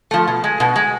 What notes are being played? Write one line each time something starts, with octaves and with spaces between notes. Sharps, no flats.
F3 A3
B2
G#3
B2
G#3